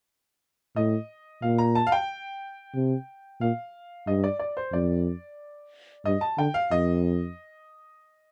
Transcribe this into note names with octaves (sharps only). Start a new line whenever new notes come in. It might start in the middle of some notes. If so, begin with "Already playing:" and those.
A2 D#5
A#2 F5
A#5
A5
F5
G5
C3
A#2 F5
G2 D#5
D5
D5
C5
F2 D5
G2 D#5
A5
D3 G5
F5
F2 D#5